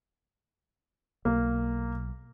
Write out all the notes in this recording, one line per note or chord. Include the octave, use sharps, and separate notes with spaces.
B1 A#3